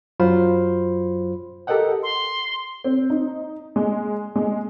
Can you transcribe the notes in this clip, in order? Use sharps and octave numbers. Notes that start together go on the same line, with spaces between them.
F#2 F#3 F4 C5 B5 C6
G4 A4 A#4 D#5 F#5 G5
C6
C4
D#4
G#3
G#3